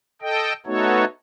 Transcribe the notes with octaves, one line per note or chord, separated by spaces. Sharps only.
A4 D#5 G5
A3 B3 D#4 F#4 A4 C#5